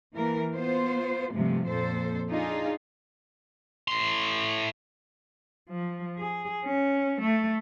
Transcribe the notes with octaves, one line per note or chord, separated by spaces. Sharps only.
E3 A#3 A#4
B3 F4 C5
G2 C3 F3 G#3 A3
F2 A#2 A4 C5
D4 D#4 F4 G#4
A2 C6
F3
G#4
C#4
A3